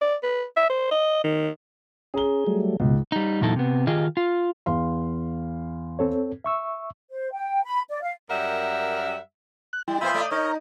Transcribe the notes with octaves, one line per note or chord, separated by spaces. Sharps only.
D5
B4
E5
C5
D#5
D#3
C#4 G#4 A#5 G7
F#3 G3 A3
C#2 G#2 B2
G3 D#4
E2 A#2 F#3 D#4 E4 A4
C3 B3
D#3 F4 G4 G#4 D#5
F4
E2 F5 C6
C4 A4 C#5
E5 C#6 E6
C5
G5
B5
D5
F5
F#2 G3 A#4 E5 F#5
F#6
G3 E4 G5
A#2 B3 F4 C5 E5 B5 D#6 G6
A3 D5
D#4 A#4 C#5 D#5
A#5